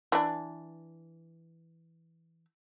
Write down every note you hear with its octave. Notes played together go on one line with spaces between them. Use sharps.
E3 D4